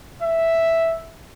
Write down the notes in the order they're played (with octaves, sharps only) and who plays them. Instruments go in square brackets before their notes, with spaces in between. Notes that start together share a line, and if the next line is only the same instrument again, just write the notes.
[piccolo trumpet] E5